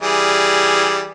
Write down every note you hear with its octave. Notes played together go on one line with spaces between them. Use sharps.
E3 G3 G#4